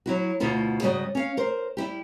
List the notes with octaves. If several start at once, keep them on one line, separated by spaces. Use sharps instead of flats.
F#3 E4 F#4
D2 B2 A3 E4 F4
G#2 C#3 G3 F#4 D#5
C#4 F5
A#4 C5
G3 E4 G4